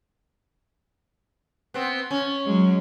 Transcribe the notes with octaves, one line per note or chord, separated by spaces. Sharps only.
B3 C4
C#4
F#3 G#3